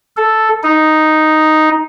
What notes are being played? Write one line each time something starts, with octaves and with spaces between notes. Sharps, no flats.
A4
D#4